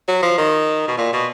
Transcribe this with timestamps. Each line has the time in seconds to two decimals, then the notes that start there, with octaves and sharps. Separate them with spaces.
0.08 F#3
0.23 F3
0.38 D#3
0.88 B2
0.98 A#2
1.13 B2